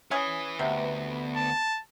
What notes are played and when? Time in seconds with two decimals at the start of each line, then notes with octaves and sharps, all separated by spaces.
0.11 C#4 E4 G#4 B4 G#5
0.59 D2 C3 B3
1.36 A5